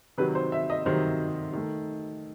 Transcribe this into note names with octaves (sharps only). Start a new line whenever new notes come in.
C3 D#3 F#3 B4
C5
E5
D#5
C3 D#3 F#3 C5
D#3 A3